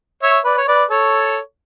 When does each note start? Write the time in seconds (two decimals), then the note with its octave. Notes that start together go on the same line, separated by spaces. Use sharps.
0.23 C#5 E5
0.45 B4 D5
0.58 C#5
0.68 B4 D5
0.90 A4 C#5